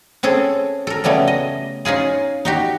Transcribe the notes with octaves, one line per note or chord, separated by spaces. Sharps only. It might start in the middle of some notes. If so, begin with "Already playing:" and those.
C4 C#4 G#4 A4
A4 A#4
C#3 G3 A3 B3 C#4
D#5
C#4 D#4 F4 G#4
D#4 F#4 G4